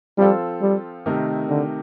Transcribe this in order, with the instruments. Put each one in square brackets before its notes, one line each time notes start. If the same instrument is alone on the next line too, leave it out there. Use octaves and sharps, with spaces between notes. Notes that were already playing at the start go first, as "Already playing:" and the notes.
[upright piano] F3 C4 F4 A4 [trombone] G3
[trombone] G3
[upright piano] C3 D#3 A3 D#4 A#4
[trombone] D3